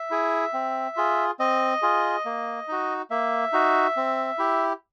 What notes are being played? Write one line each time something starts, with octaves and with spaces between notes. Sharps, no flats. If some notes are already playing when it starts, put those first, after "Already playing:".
Already playing: E5
E4 G#4
C4
F4 G#4
C4 D#5
F4 G#4
A#3
D#4 F#4
A#3 E5
D#4 F#4
C4
E4 G4